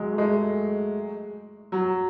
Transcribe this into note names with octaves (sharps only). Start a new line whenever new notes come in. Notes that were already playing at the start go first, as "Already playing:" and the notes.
Already playing: F#3 G#3
A3
G#3
F#3